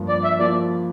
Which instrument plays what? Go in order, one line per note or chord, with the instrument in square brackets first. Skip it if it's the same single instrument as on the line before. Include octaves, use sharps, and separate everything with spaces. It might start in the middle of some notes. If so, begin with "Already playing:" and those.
Already playing: [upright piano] G2 F3 A#3
[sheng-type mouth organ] D5
E5
[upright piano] F3 A#3 [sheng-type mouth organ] D5